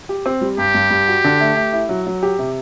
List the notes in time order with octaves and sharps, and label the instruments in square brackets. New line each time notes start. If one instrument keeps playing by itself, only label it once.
[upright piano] G4
C4
G3
[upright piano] G2 [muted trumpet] G4
[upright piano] G2
G2
F#4
D3
A3
A3
E4
F#3
F#3
G4
C3